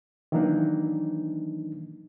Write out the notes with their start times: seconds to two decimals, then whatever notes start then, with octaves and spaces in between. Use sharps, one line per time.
0.32 D#3 E3 F#3 A#3 D4 D#4